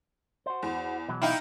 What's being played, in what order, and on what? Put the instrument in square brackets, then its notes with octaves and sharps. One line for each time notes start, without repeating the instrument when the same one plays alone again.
[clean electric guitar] F#4 C5
[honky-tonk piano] E2
[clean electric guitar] B2 E3 F#3
[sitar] D#4 E4 [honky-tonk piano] F5 G5